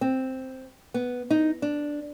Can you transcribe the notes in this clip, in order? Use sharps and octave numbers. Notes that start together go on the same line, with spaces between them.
C4
B3
D#4
D4